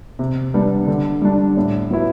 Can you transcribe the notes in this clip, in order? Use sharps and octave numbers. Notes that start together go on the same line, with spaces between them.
C3
G3 B3 D4
D3
G3 D4
A2
F#3 B3 E4